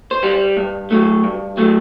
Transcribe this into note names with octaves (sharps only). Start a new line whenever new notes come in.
C5
G3
G2
F#3 A3
G2
F#3 A3